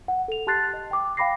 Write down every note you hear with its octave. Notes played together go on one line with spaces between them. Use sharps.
F#5
A4 F7
G4 A5 C6 F#6 A6 C7
D#5
G5 D6
F5 G5 B5 D6 A#6 C7